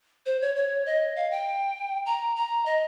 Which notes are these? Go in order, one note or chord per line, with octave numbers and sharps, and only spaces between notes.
C5
C#5
C#5
D#5
F5
G5
A#5
A#5
D#5